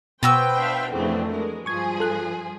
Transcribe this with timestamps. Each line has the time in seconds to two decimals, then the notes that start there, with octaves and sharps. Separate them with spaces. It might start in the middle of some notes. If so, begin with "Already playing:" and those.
0.23 B2 B3 F#4 B4 C5 G5 E6
0.56 D4 E5 F5
0.91 F2 C#3 E3 A3 C4 D4
1.29 G#3 A#4
1.66 G2 F3 G#4 C#6 G#6
2.00 A4 F#6